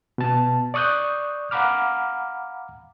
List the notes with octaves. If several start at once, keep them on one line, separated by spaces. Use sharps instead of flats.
B2 A5
D5 C#6 D#6 F#6 G6
F5 F#5 A#5 B5 D6 F6